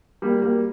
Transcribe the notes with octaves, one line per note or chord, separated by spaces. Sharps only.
G3 A#3
G3 A#3